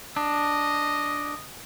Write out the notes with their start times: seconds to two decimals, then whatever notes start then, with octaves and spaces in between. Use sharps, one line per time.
0.16 D4 D#5